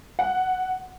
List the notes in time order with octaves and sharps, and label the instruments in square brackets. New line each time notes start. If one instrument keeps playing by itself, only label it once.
[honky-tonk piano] F#5